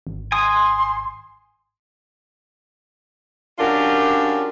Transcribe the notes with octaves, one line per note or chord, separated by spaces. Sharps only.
G#1
G#5 C6 D#6
F#3 C#4 D4 F4 G4 A#4